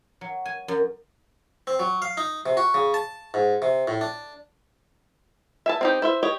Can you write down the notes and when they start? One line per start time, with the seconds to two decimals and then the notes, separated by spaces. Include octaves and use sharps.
0.21 F#3
0.45 G#5
0.68 F#2
1.67 C4
1.79 F#3
2.02 F5
2.17 D#4
2.46 C3
2.57 F#4
2.74 C#3
2.94 A5
3.34 G#2
3.62 C3
3.88 A2
4.01 D4
5.66 E5 G#5 A5
5.81 C4 D#4 G4
6.02 E4 C5 E5
6.23 G4 C#5 D#5